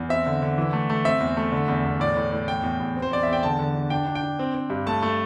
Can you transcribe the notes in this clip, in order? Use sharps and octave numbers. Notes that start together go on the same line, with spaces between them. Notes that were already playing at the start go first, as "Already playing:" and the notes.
Already playing: E2
C4 E5
D3
D3
E3
A3
A3
C4 E5
E2
A3
D3
E2
E2
A2 D5
A2
A2
E2 G5
E2
E2
C4
C5
E2 D5
E2 E5
G5
D3 A5
D3
D4
D4 G5
D4
G5
D4
C4
C4
G2
A3 A5
A3